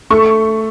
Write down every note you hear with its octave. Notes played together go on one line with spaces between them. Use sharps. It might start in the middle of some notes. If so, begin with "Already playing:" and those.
A3 C#6